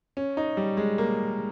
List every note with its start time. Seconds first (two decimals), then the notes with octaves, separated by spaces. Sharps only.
0.17 C#4
0.37 D#4
0.57 G3
0.77 G#3
0.98 A#3